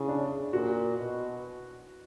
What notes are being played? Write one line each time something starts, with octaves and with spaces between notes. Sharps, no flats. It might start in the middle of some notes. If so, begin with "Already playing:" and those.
Already playing: C#3 E4
D4
A#2 F#4
B2